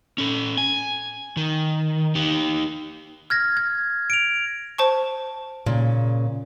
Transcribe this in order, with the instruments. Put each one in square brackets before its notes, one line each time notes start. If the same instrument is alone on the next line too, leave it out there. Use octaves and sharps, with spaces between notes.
[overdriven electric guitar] C#4 A4
G#5
D#3
D#4 G4
[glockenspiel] F6 G#6 A#6
G#6
D7 F7
[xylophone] C5 A5 C#6
[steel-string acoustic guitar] A#2 C#3